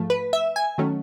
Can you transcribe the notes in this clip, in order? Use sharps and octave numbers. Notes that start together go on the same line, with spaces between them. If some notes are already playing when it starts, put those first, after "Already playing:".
Already playing: G#2 F3 A3
B4
E5
G#5
D#3 F#3 A3 C#4